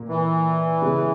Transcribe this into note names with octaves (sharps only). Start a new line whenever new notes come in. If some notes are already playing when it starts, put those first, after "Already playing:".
Already playing: A#2 A#3
E3
C#3 G#3 B3